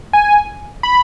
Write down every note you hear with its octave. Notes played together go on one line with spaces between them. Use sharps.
G#5
B5